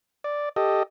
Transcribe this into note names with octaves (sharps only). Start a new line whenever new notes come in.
D5
G4 A4 D#5